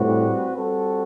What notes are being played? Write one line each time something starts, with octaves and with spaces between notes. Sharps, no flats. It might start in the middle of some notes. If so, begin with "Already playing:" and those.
Already playing: A2 G3 C4 F#4 B4
G3 C4 F#4 A4